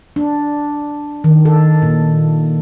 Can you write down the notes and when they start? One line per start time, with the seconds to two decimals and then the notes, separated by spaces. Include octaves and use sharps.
0.16 D4
1.24 D#3
1.45 A4
1.82 A#2